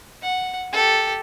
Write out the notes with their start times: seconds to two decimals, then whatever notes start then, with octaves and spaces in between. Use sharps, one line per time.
0.22 F#5
0.72 G4 A4